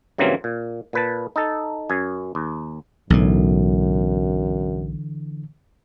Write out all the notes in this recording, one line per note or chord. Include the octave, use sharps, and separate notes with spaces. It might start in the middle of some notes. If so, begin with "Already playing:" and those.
G2 C#3 E3 F#3 A#3 C4
A#2
A#2 B4 A5
D#4 A4
F#2 G#5
D#2
B1 F#2 A2 D3 E3